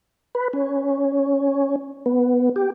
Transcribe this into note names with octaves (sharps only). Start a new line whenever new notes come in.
B4
C#4
B3
G4